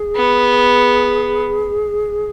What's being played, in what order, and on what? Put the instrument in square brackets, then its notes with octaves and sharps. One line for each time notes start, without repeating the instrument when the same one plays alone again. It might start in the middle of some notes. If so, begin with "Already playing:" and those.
Already playing: [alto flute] G#4
[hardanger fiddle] B3